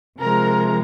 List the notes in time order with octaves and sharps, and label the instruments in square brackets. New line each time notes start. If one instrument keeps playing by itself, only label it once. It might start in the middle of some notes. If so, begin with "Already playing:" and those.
[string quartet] C3 F3 G#3 A#4 A#5